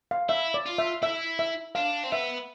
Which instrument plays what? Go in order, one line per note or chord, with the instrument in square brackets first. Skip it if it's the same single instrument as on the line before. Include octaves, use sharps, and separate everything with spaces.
[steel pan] F5
[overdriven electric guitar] E4 [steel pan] E5
[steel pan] D5
[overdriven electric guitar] F4
[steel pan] E5
[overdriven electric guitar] E4 [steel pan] E5
[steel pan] E5
[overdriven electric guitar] D4 [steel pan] F5
[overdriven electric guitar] C4
[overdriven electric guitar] B3 [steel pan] E5